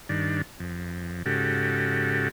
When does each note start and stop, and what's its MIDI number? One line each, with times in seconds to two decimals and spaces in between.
0.09 0.42 43
0.09 0.42 51
0.09 0.42 62
0.60 1.23 41
1.26 2.29 44
1.26 2.29 49
1.26 2.29 66
1.26 2.29 67
1.26 2.29 69